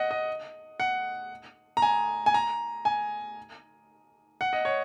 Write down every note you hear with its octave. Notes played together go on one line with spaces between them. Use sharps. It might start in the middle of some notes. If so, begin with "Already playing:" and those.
Already playing: D#5 F#5
D#5
F#5
A#5
G#5
G#5
A#5
G#5
F#5
D#5
C#5